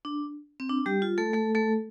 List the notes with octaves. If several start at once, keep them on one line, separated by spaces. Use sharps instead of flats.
D4
C4
D4
G3 G4
F4
A3 A4
A3 A4
A3 A4